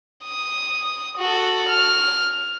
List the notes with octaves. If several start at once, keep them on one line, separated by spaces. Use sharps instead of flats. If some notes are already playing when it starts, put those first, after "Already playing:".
D#6
F#4 A4
F6